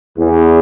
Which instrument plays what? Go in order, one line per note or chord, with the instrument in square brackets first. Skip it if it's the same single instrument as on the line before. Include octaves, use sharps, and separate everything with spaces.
[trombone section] E2